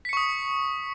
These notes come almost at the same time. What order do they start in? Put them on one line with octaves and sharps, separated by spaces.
B6 C#7 C#6 D#6